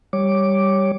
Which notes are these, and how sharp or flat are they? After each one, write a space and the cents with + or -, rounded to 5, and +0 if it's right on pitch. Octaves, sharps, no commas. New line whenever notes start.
G3 +0 C#5 +0 D6 +0